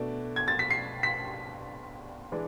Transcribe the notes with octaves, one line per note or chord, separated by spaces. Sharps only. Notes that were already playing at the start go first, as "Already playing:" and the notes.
Already playing: B2 A3 D4
G#6
A6
B6
C7
B6
E3 G#3 D4